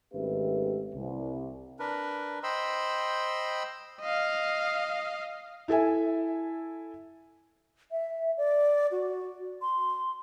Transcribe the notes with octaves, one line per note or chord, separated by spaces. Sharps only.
G#1 A3 C#4 G4 B4 E5
C2
D4 A#4 B4
C5 D#5 G5 B5 C6 E6
D#5 F5
E4 A4 E5 G#5
E5
D5
F#4
C6